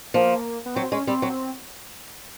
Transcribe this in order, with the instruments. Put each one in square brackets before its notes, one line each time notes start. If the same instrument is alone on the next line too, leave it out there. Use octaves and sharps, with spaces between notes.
[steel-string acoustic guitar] F3 [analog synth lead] A#3
[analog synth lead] B3
[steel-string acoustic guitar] F#3 [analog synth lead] C4
[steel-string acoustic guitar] G#3 [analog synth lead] C#4
[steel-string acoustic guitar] G3 [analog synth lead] C4
[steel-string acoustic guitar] F#3